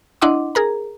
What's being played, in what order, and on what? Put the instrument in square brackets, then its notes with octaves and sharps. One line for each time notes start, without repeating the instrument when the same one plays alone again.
[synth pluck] D4 E4 D#5 F#5 C6 D6
G#4 A#4 A#5